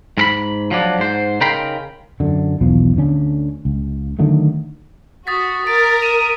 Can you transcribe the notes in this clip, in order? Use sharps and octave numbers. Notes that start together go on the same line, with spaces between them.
G#2 A#4 B5
F3 F#3 D4
G#2 C5
C#3 D#4 A#4 G5 B5 C6
F#2 D3
B1 E2 B2 F3
D2 D3 C#4
C#2
D3 D#3 F#3 A3
F#4 D#6 A6 B6
A#4 A6 D7
D#7 E7